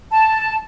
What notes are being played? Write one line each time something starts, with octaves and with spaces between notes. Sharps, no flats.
A5